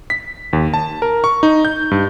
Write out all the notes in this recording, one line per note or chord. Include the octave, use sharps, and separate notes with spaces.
B6
D#2
A5
A#4
C#6
D#4
G6
G2